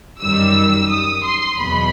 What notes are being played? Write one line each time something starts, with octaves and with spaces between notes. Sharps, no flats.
F#2 D#3 G3 E6
D#6
C6
E2 B2 F#3 B5